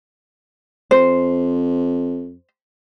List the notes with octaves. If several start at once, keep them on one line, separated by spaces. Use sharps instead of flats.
F2 C5